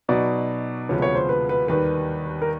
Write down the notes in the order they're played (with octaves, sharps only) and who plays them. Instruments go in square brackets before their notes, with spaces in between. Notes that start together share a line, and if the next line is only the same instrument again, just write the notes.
[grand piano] B2 F#3 B3 D#4 [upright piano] D5
[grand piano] D2 C3 F3 G#3 B3 [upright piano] C#5
[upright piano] C#5
C5
B4
B4
[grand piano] D#2 D#3 G3 [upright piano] B4
[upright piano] A#4